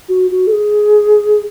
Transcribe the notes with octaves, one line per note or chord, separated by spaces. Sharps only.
F#4
F#4
A4
G#4